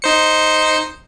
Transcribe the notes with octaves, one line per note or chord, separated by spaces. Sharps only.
D#4 C5 C#7